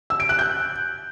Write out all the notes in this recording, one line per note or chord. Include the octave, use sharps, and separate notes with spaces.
E6
D7
F#6
G6